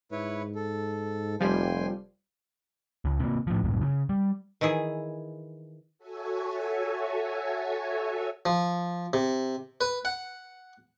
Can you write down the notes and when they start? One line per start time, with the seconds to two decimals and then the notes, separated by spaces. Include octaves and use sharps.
0.12 G#2 E4 B4 C#5
0.55 A4
1.41 F1 F3 G3 G5 G#5 C6
3.05 C#2
3.19 C3 A#3
3.47 A2 F3
3.63 C2 F#2 A2
3.81 C#3
4.09 G3
4.61 D#3 E3 E4 G#4
5.98 F#4 A4 C#5 E5 G#5
8.46 F3
9.13 C3
9.81 B4
10.05 F#5